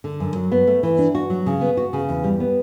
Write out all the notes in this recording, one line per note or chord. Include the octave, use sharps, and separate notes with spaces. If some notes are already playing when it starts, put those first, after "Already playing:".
D3
F#2
F#3
B3
A3
E3
D4
F#4
F#3
C#3
B3
F#4
C#3
E2
G3
B3